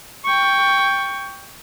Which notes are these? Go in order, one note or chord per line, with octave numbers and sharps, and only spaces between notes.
G5 C#6